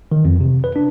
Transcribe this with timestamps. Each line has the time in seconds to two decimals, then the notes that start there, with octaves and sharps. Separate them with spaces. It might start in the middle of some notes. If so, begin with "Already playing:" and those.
0.12 D#3
0.25 F2
0.40 C3
0.64 B4
0.76 D4